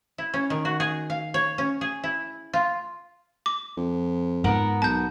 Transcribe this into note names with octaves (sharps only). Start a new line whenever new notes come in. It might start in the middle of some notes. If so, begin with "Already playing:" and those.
E4
C#4
D#3
F#4
G#4
F5
C#5
C#4
G#4
E4
F4
D6
F2
G#2 B3 A#4 F#5
B1 A5 G6